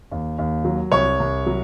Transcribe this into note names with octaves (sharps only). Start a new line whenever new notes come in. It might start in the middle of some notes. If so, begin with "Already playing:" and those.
D#2
D#2
F#3
C2 C#5
C2
F#3